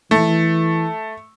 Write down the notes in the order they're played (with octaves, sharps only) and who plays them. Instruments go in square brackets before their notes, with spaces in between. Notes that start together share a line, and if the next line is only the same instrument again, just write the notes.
[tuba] E3 [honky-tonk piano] A3